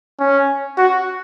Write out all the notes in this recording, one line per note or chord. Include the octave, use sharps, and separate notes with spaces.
C#4
F#4